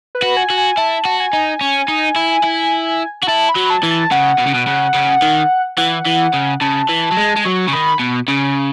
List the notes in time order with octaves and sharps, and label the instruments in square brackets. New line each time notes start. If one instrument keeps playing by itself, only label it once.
[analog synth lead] B4
[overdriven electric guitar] F#4
[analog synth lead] G#5
[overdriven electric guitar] F#4
[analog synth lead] G#5
[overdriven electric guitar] E4 [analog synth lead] A5
[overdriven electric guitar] F#4
[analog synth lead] G#5
[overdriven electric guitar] D#4
C#4
D#4
E4
E4
F#4
[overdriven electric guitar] E4 [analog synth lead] A5
[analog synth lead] B5
[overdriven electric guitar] F#3
[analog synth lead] A5
[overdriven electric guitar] E3
[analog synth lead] A5
[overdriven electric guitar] C#3 [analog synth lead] F#5
[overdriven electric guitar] B2
C#3
B2
C#3
C#3
D#3
[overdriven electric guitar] E3 [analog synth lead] F#5
[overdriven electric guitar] E3
C#3
[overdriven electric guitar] C#3 [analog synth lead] A5
[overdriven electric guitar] E3
F#3
G#3
G#3
[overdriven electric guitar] F#3 [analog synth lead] C#6
[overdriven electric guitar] C#3
[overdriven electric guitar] D#3 [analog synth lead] B5
[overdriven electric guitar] B2
C#3